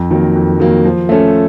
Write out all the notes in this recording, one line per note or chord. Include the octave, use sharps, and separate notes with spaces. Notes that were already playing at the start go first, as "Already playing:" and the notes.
Already playing: F2
D#3 F#3 A#3
F2
D#3 F#3 A#3
F3
A3 C#4 A4